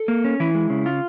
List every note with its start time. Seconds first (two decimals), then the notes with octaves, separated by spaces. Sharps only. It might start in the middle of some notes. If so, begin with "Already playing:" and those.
Already playing: A4
0.08 A#3
0.25 C#4
0.40 E3 E4
0.55 G#3
0.70 C#3
0.86 F4